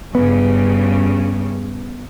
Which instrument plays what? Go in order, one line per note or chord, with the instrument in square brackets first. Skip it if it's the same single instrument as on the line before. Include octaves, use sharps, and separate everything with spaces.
[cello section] G2 C#3 [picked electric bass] B3